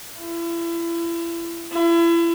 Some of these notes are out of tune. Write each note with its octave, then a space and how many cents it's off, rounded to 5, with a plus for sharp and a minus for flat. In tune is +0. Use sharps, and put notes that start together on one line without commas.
E4 +35
E4 +35